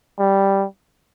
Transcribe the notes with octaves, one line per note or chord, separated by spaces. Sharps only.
G3